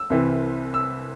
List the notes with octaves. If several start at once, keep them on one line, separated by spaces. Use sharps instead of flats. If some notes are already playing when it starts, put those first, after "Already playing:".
Already playing: E6
C2 C3 E3 C4
E6